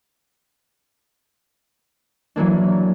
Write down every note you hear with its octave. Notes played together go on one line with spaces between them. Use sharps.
E3 F#3 A#3 D4